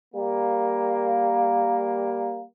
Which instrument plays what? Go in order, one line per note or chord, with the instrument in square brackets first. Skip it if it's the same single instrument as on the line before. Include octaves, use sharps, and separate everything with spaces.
[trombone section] G3 A#3